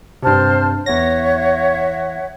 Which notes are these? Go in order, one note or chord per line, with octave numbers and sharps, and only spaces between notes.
G2 C3 C5 A5 F6
E2 C#5 E5 F#5 A#6